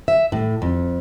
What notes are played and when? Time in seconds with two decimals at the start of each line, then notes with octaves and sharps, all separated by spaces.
0.08 E5
0.32 A2
0.62 F2